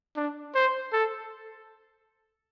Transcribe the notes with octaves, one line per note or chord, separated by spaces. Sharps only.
D4
C5
A4